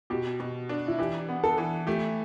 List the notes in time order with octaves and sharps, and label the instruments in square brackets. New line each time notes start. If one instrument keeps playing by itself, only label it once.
[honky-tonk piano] B2 [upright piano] G4
[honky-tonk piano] B2
D4
[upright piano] E4
[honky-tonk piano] E3 [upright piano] G4
[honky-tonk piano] B3
[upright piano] A4
[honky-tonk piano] E3
[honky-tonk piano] A3 [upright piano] G4